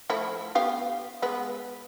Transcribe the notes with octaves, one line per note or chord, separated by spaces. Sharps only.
F3 A3 E4
B3 G4 F5
G#3 B3 B4